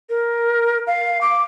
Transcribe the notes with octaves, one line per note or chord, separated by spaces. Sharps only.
A#4
F5
D6